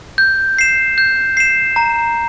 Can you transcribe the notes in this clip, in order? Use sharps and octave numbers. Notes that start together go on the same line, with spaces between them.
G6
C7 E7
G6
C7 E7
A#5